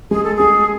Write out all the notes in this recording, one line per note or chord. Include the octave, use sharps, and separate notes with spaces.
G#3 G#4
A4
G#4
G#3